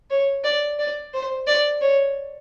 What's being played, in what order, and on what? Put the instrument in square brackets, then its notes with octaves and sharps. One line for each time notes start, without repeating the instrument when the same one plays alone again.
[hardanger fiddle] C#5
D5
D5
C5
D5
C#5